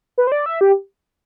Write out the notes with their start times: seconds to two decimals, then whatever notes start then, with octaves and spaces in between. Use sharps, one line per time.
0.18 B4
0.27 C5
0.32 D5
0.46 E5
0.61 G4